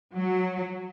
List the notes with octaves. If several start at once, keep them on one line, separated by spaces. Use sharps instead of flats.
F#3